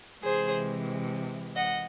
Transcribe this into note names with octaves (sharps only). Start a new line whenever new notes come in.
C3 E3 G#3 G#4 C5
D#5 F#5